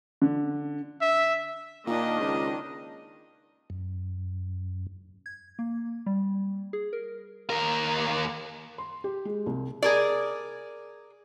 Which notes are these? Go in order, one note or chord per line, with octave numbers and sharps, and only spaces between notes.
D3
E5
A#2 D#3 D4 D#5
C#2
F#2
G#6
A#3
G3
G#4
A#4
D#2 A#4
C6
G4
G#3
C2
G#4 A#4 D5